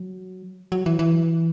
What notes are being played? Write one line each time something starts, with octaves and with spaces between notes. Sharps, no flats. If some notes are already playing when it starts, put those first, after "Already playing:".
Already playing: F#3
F#3
E3
E3